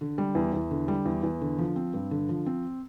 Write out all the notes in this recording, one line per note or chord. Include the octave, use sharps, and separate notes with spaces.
D3
G3
E2
E2
D3
G3
E2
E2
D3
F3
C4
G2
D3
F3
C4